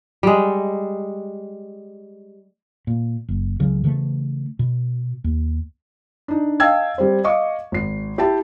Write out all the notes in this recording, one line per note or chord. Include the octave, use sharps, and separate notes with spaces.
G3 G#3
A#2
F#1
C#2 C#3 F#3
C#3 E3 G#3 A3
B2
D#2
D4 D#4
D#5 F5 G5 A5 E6 G#6
G3 C4 C5
D#5 F5 C#6 D6
G#1 C7
E4 G4 E5 G5 A5